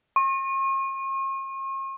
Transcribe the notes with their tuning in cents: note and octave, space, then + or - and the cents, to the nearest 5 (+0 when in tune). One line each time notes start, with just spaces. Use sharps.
C#6 -45